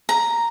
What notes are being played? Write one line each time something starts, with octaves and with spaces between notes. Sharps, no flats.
A#5